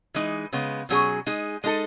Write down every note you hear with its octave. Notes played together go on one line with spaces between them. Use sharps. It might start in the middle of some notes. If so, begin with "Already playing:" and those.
E3 G#3 D#4
C#3 G#3 B3
B2 F#3 C#4 G#4
G#3 D#4 G#4
G#3 D#4 A4